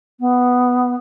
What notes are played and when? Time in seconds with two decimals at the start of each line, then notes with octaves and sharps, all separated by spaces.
0.20 B3